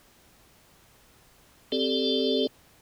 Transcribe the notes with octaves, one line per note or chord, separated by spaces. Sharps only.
C4 G4 A4 D5